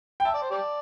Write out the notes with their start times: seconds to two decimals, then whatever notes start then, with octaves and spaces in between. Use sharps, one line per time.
0.20 G5
0.25 E5 A5
0.34 D5
0.42 C5
0.51 G4 D5